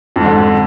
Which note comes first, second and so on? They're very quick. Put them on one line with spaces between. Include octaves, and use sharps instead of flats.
F2 G#2 D3